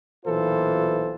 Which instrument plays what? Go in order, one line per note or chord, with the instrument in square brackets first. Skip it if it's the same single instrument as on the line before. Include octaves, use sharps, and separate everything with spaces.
[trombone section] B1 A#2 E3 F4 A4 C5